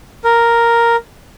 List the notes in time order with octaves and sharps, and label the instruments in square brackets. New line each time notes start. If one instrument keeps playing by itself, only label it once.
[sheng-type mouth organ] A#4